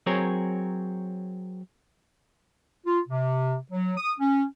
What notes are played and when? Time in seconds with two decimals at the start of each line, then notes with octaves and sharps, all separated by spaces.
0.06 F#3 C4 G#4 A#4 C#5
2.86 F4
3.08 C3
3.71 F#3
3.98 D#6
4.20 C#4